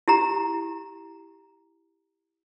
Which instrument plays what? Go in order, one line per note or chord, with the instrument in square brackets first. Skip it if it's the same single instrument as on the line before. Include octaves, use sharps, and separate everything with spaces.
[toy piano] E4 G4 A#5